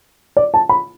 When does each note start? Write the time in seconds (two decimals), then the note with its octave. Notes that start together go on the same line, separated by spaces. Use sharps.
0.37 D5
0.54 A5
0.69 B5